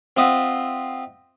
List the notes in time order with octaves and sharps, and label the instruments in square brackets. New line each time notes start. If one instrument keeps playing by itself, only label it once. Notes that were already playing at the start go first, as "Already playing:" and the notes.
[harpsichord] C4 F4 D#5 E5 F#5